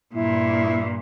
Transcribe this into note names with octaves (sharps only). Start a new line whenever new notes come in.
G2 A#2 E4